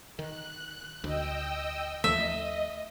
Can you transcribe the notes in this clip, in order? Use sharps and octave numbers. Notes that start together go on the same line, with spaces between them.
D#3 F#6
D2 D#5 G5 E6
D#2 F3 A3 D#5 E5